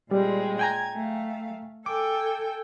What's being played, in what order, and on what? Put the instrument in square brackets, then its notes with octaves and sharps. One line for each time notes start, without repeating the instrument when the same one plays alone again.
[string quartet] A#2 G#3 C4 [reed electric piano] G3
[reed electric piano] G5 G#5 A#5 [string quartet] G#6
[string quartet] A3 F5
[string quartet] A4 G5 G#5 [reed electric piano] D6